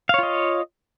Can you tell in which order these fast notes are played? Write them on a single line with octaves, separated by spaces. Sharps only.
F5 C#5 F4 D#5